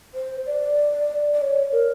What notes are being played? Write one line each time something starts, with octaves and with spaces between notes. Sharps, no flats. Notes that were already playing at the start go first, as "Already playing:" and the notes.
C5
D5
D5
C#5
A#4